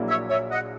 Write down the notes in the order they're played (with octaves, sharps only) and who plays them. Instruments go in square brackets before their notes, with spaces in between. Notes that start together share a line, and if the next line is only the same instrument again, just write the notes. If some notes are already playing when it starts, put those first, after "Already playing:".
Already playing: [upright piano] A#1 A#2 F#3 A#3 E4
[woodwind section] C#5 E5
C#5 E5
D#5 F#5